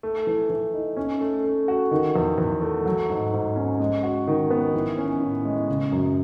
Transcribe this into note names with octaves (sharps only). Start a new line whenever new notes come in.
A3
E3
E3
D#4
C#4
A3
A3
F#4
D#3
E2
E2
A3
F#3
G#2
G#2
C#4
G#3
F#4
D#3
B3
E3
C#4
A2
G#3
C#3
F#2